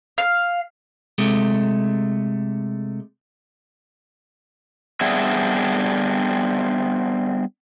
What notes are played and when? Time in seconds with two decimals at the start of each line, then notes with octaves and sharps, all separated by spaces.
0.18 F5
1.18 C3 G#3 A3
5.01 G3 B3 C4 D4 G#4 E5